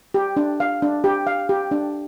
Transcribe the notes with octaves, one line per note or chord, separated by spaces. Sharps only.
G4
D4
F5
D4
G4
F5
G4
D4